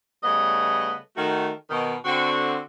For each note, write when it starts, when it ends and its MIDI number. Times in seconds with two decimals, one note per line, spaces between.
0.24 0.98 49
0.24 0.98 55
0.24 0.98 57
0.24 0.98 59
0.24 0.98 75
1.16 1.50 51
1.16 1.50 57
1.16 1.50 66
1.70 1.95 47
1.70 1.95 51
2.05 2.60 50
2.05 2.60 60
2.05 2.60 66